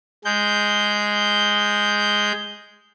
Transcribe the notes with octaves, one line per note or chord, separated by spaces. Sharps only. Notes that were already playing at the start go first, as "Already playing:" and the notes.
G#3 G6